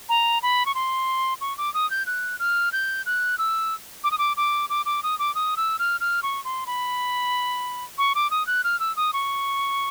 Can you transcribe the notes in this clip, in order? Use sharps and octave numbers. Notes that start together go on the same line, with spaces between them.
A#5
B5
C#6
C6
C#6
D6
D#6
G6
F#6
F6
G6
F#6
E6
D6
D#6
D6
D6
D6
D6
D#6
D6
D#6
E6
F6
F6
C#6
C6
B5
C#6
D6
D#6
F#6
F6
E6
D#6
C#6